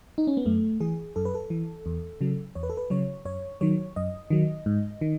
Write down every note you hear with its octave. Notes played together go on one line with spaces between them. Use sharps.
D#4
C#4
B3
F#2 A3
E3 G#4
F#2 A4
B4
A4
E3
E2
C#3 F#3
E2 C#5
B4
A4
B4
C#3 F#3 C#5
F#2 C#5
D#3 F#3 C#5
F#2 D#5
D#3 F#3
G#2
D#3